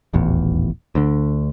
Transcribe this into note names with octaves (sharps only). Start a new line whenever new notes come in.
D#1 A1 E2
D2 D3